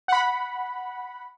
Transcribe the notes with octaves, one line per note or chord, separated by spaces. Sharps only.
F#5 B5